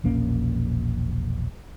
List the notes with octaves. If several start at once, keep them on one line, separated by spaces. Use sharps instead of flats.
E1 A#1 A#3 C#4